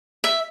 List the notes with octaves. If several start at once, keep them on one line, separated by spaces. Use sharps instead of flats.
E5